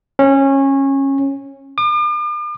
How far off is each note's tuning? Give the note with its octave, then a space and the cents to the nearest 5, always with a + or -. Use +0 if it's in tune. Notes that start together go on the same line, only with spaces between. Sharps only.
C#4 -20
D6 +45